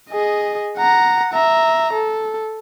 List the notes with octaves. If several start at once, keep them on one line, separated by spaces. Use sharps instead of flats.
G#4 D#5
F#5 A#5
E5 A#5
A4